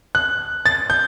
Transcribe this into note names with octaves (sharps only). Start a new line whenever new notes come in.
F#6
A6
G6